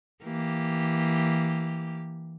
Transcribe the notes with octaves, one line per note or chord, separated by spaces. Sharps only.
E3 A#3 G4